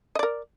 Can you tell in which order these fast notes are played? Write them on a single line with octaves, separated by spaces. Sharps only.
D#5 D5 A#4